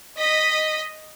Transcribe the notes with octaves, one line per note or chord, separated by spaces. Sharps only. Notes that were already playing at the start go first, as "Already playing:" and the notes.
D#5 B6